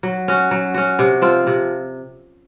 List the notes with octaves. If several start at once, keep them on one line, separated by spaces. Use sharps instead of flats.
F#3
C#4 F#4
F#3
C#4 F#4
C3
F3 C4 F4
C3